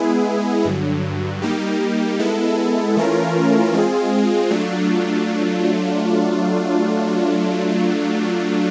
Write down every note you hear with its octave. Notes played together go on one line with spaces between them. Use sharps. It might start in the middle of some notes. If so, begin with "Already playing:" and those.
Already playing: G#3 B3 E4 G#4
G2 D3 F#3
G3 A#3 D#4 G4
G#3 B3 E4 A4
E3 A3 C#4 F4 A#4
G#3 C4 F4 G#4
F#3 A3 D4 F4